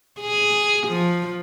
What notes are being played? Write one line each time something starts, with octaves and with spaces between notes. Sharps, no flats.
G#4
F3